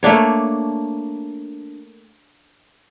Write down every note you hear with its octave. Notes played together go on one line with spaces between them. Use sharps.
A3 A#3 D4 C#5